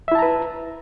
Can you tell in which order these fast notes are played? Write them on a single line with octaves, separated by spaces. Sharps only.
E5 E4 A5 A#5 B4